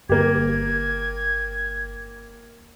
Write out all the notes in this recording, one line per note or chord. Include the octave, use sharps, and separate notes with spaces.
G1 A#3 G4 G#6